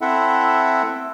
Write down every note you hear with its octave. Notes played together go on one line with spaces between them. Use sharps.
C4 E4 A4 E5 F#5